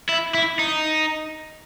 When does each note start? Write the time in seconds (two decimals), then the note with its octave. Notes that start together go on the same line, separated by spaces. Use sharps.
0.09 E4
0.34 E4
0.59 D#4